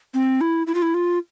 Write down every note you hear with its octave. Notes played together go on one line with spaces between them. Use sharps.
C4
E4
E4
F4
E4
F4